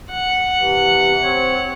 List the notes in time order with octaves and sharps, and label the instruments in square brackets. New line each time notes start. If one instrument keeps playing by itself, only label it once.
[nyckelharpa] F#5
[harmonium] C3 E3
C4 C#5